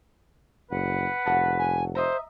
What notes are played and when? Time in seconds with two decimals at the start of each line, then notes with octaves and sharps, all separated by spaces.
0.71 F#1 B4 F#5
1.26 F1 F#4 A4 A5
1.59 G#5
1.95 C5 D#5 E5 A#5